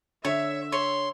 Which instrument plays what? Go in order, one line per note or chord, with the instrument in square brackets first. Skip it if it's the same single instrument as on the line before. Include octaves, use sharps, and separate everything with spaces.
[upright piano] D3 [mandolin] C#5 [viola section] E5
[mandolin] C#5 [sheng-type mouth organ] C6